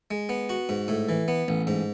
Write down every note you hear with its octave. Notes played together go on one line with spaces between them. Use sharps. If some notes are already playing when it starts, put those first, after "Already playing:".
G#3
B3
F#4
G#2
A2
E3
B3
A1
G#2